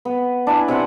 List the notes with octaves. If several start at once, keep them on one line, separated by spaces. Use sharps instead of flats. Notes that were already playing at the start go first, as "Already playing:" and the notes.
B3
D4 E4 G#5
C3 C4 F#5